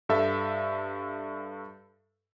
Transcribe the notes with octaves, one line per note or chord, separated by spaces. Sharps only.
G2 A4 E5